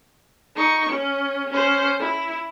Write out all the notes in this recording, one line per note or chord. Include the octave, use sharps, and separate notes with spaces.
D#4 C#6
C#4
C#4 C5
E4